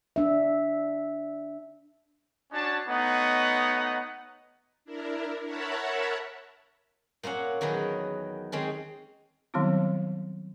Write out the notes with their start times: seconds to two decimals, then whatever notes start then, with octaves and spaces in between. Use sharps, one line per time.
0.16 D4 E5
2.52 C#4 D4 F#4 G#5 A5
2.88 A3 B3 D#4 C#5 D#5 F#5
4.85 D4 E4 A#4
5.45 A#4 C#5 E5 F#5 A5 B5
7.23 A#2 A#3 C#4 F#5
7.61 E2 D#3 F#3 A#4 B4
8.52 D#3 G#3 C4 C#4
9.54 D#3 F#3 G3 B3 C4 E4